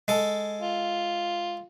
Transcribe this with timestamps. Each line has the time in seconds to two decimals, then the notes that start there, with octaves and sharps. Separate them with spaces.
0.08 G#3 A4
0.61 F4